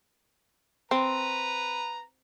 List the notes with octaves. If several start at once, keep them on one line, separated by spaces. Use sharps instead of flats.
C4 B4 A#5